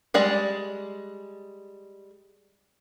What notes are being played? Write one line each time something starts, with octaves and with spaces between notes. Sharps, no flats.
G3 G#3 D5